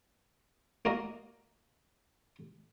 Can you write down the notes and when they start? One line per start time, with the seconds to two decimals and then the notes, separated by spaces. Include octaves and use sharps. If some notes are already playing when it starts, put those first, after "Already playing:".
0.85 A#3 F#4 A#4 D#5 D#6